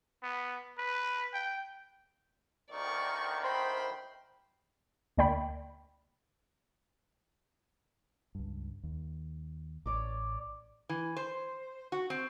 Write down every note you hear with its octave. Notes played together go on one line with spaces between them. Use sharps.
B3
B4
G5
D2 D#3 D5 C#6
C5 G5 B5 C6
D2 A#3 D5 G5 B5
C#2 G2
D#2
A1 C#5 D5 D6
E3
C5
F#4
C4